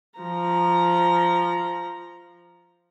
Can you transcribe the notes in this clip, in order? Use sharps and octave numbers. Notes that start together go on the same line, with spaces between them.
F3 A#5